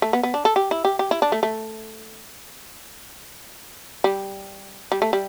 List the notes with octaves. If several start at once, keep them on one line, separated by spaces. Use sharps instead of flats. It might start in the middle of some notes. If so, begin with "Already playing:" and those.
A3
B3
B3
D4
A4
G4
E4
G4
G4
E4
D4
A3
A3
G3
G3
A3
G3